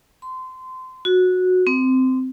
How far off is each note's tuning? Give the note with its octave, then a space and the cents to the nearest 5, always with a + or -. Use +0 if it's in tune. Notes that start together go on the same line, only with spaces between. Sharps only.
C6 -25
F#4 -15
C4 -15